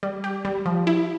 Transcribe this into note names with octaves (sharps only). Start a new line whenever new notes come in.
G3
G4
G3
F3
E4